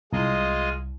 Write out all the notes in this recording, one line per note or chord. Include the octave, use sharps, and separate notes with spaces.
C2 G#3 F4 D#5